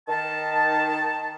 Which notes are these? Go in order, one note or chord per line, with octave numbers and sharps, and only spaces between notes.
D#3 A5